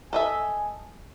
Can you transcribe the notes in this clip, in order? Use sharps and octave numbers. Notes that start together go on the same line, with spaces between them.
A4 D#5 E5 G#5